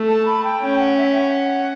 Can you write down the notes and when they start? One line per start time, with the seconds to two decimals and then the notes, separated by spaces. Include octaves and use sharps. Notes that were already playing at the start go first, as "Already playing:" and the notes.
Already playing: A3
0.09 A5
0.26 B5
0.44 G5
0.62 C#4 G5
0.79 F#5
0.97 E5
1.15 G5
1.19 F#5